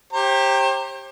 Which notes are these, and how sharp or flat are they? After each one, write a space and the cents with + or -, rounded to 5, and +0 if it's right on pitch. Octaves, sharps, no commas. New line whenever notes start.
G4 +5 C5 +40 A#5 -25